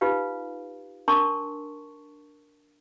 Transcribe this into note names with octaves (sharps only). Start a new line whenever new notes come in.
D#4 F4 G4 B4 F5
D4 A#4 A5 C6 C#6